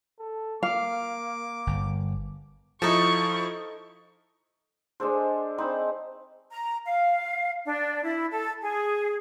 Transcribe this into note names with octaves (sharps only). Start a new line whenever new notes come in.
A4
A#3 F5 D6
G1
F3 D#4 E4 A4 C#6
G#3 D4 A4 C5
C4 D#4 C5 B5
A#5
F5
D4
E4
A4
G#4